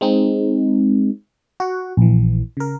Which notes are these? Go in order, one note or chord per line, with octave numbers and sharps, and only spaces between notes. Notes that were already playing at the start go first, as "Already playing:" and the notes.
G#3 C4 D#4
F#4 F#5
A#1 E3
C#3 A#4